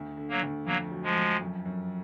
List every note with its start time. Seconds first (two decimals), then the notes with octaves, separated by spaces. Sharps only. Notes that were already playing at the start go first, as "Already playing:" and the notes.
Already playing: D2
0.17 D3
0.29 F#3 A#3
0.42 D2
0.66 F2 F#3 A#3
0.92 F#3
1.03 F3 G#3
1.16 F2
1.41 F#2
1.65 F#2